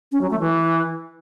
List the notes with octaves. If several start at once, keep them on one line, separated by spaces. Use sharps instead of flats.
C#4
F#3
A3
E3